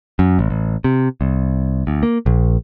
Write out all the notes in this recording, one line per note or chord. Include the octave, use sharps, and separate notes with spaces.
F#2
A1
A1
C3
C2
D2
A#3
A#1